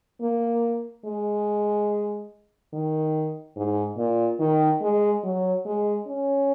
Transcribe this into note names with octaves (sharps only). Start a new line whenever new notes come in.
A#3
G#3
D#3
G#2
A#2
D#3
G#3
F#3
G#3
C#4